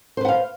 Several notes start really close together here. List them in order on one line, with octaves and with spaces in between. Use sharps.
C5 B4 F#5 F5